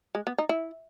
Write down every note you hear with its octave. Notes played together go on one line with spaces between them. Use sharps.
G#3
B3
D#4
E4